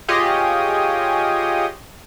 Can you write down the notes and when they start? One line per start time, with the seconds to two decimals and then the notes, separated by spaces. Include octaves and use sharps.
0.08 F4 G4 G#4 C#5 D#5